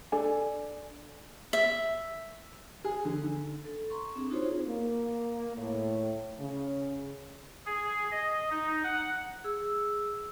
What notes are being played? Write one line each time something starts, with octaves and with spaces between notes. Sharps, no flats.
D4 A4 D5 G#5
E5
G#4
D3
D3
A4
A#5 C6 C#6
C4 D4 G#4
D#4 F4 F#4 G#4 C5 C#5
A#3
A2
C#3
G#4
D#5
D#4
F#5
G#4 E6